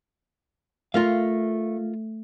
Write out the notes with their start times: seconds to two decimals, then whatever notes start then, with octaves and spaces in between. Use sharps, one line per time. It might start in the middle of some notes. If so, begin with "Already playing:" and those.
0.94 A3 F4 A#4 F5